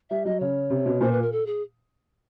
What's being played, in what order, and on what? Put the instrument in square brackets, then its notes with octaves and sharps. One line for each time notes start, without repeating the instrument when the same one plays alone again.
[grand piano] G3 [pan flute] E5
[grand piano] F#3 [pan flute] D#5
[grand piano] C#3 [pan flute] C#5
[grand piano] C3
B2
[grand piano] A#2 [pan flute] C5
[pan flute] B4
A#4
A4
G#4